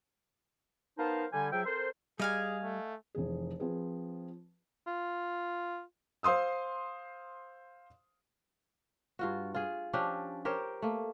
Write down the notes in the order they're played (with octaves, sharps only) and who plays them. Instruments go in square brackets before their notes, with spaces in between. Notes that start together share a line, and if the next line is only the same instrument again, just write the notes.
[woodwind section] B3 D#4 A#4 C5 F5 A5
D3 G3 G#5
F3 F#3 G#4 E5 G5
C4 A4 A#4 C5
[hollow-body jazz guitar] G3 [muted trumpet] G#4 [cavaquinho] D#5 F5 G#5
[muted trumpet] A3
[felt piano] F1 E3 G#4
F3 C4 G#4 B4
[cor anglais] F4
[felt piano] C5 F5 C6 D#6 E6
[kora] G2 F4 F#4
F4 G#4
F3 C#4 D4 G4
G4 A#4 C5 C#5
A3 A#3